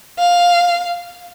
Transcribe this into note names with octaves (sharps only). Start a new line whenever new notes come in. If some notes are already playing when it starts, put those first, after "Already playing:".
F5